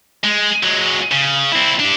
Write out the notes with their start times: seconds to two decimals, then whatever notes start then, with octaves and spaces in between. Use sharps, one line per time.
0.24 G#3
0.63 F#3 G#3
1.12 C#3
1.52 C4 E4
1.80 D4 G4